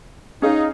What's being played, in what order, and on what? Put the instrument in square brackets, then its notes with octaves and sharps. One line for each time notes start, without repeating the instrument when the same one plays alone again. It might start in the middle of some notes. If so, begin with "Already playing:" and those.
[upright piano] C#4 G#4 F5 [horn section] D#4